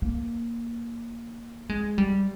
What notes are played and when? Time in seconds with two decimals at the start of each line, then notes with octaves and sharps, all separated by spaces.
0.02 A#3
1.69 G#3
1.98 G3